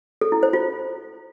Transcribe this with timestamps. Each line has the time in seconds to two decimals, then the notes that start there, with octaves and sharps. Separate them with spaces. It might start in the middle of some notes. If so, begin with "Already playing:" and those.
0.21 A4
0.32 E4
0.43 C5
0.53 F4